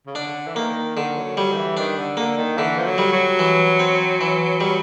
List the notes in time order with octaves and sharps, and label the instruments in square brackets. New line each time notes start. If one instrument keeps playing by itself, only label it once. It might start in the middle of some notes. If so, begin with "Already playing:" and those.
[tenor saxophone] C#3
[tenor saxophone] D3 [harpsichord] D4
[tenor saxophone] E3
[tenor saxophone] D#3 [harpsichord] A#3
[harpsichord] D3 [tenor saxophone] D#3
[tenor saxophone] F#3
[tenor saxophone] F#3 [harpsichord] G3
[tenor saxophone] D#3
E3
[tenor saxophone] D#3 [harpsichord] D4
[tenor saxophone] D3
[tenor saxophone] D3 [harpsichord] A#3
[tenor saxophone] D#3
[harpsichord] D3 [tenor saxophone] E3
[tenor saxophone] F3
F#3
[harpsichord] G3
[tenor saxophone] F#3
[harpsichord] E3
C4
E3
G3